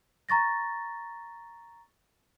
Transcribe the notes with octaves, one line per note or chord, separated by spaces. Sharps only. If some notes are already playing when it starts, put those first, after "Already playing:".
A#5 C#6 A6 A#6